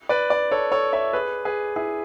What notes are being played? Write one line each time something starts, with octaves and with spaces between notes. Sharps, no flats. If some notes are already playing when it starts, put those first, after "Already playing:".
B4 D5
B4 D5
A4 C#5
A4 C#5
C#5 E5
G#4 B4
G#4 B4
E4 G#4